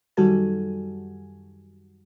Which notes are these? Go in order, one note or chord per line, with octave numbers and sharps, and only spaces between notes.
F#2 D#3 G3 F#4 A4 G#5